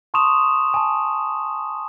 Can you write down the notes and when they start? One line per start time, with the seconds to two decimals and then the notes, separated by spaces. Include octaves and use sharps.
0.14 A5 C6 C#6 D#6 E7 F7
0.74 G#5 A5